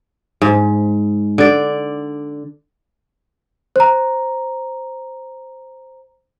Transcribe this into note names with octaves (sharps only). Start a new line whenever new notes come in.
G#2
D3 D5
C5 A#5